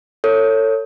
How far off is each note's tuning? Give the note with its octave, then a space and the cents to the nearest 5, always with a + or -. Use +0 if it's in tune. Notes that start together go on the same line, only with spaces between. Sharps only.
A4 +30 C#5 +0